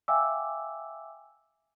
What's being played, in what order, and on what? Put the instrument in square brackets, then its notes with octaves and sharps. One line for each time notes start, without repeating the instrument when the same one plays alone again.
[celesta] E5 F5 G5 G#5 D6 E6